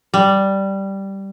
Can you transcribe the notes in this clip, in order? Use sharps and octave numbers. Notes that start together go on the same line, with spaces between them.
G3